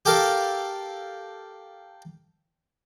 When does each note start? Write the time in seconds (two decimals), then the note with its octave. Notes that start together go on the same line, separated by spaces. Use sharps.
0.05 G4 A4 A#4 F5